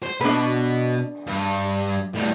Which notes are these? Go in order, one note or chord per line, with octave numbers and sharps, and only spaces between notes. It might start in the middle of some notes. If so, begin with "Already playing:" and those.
C5
B2 D4 B4
G2
A2 G3